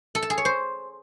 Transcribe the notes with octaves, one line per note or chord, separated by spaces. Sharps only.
A4
A5
G#4
C#5
C5